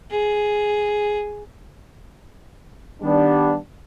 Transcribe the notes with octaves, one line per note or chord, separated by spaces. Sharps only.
G#4
D#3 G3 B3 D4